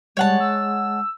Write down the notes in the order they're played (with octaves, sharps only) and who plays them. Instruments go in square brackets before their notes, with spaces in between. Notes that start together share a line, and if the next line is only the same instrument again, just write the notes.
[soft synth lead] G3 [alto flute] G#3 [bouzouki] C#5 F#5 A5
[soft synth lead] E6